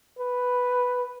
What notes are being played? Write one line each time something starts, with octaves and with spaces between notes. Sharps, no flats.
B4